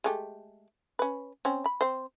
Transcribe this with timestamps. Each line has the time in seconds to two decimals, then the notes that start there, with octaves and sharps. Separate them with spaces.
0.04 G#3 A3 G4
0.99 C#4 B4
1.45 C4 C#4
1.66 B5
1.81 C4 C5